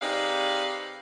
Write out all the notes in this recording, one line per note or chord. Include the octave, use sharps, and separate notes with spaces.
C3 D#4 G#4 B4 D5 F5